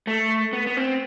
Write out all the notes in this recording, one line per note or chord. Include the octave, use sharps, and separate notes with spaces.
A3
B3
B3
C4